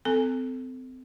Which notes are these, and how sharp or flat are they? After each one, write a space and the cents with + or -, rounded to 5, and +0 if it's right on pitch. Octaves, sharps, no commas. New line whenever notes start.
C4 -35 A4 +0 G#5 -15